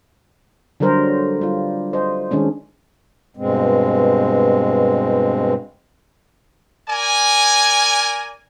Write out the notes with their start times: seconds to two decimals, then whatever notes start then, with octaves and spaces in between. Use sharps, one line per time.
0.80 D3 F#3 G3 A#4 C5
1.41 G3 F4
1.93 C5 D#5
2.31 D#3 G#3 C#4 D4
3.37 G2 B2 G#3 C4
6.89 A#4 D5 G#5